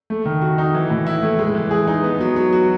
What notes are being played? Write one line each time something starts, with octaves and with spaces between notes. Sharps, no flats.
A3
D#3
F#4
D#4
E3
A2
E4
A3
G#3
E3
G#4
D#4
B3
F#3
F#3
F#4